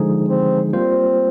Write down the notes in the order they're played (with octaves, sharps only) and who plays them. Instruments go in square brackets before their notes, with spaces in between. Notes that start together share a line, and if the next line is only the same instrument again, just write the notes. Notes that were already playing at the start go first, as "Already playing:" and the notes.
Already playing: [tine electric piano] D3 F3 G#3 D#4 G#4
[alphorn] C4
[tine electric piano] G3 A#3 F4 C5 [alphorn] C4